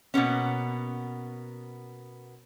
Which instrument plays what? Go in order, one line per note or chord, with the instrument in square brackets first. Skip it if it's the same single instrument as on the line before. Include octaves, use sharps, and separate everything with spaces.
[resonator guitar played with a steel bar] B2 A#3 B3 C#4